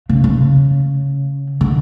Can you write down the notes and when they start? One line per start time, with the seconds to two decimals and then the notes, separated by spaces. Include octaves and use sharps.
0.09 C#3
0.24 C#3
1.61 D3